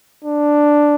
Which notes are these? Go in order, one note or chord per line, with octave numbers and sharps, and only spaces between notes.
D4